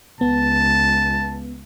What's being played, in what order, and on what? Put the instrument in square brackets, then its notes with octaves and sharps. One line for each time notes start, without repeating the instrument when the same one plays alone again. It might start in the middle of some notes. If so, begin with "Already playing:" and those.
[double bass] C#2 [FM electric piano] B3 [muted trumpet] A5